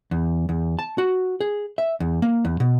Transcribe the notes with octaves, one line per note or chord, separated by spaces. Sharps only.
E2
E2
A5
F#4
G#4
E5
E2
A#3
E2
B2